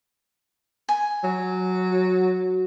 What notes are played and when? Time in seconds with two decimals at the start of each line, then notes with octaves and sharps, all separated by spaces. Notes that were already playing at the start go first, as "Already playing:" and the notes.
0.89 G#5
1.24 F#3
1.90 F#4